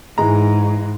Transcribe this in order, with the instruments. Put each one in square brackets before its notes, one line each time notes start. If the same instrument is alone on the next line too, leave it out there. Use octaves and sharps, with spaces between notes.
[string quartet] G#2 [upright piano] E3 G#3 A#5